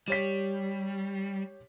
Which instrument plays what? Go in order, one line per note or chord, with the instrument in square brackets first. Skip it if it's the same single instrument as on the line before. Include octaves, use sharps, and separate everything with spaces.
[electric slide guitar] G3 [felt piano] G4 C#5 B6